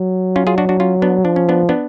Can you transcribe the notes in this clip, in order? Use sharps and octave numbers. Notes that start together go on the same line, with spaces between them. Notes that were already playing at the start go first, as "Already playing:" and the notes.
Already playing: F#3
C#4 F4
F4 G#4
D4 F#4
D4 F#4
C#4 F4
B3 D4
F3 D4
C#4
B3 D4
B3 D4